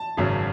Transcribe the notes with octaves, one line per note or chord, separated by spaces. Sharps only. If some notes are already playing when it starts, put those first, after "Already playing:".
Already playing: A5
G#1 F#2 C#3 F#3